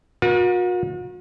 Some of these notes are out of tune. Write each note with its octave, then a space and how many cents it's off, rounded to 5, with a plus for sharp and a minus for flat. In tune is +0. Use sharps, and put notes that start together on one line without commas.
F#4 -45 A#4 +40